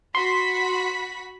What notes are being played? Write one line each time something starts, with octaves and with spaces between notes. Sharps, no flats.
F#4 B5 C6 B6